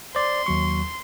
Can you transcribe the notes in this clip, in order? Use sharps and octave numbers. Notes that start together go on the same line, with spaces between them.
C5 D5 C6
D#2 F#3 C#6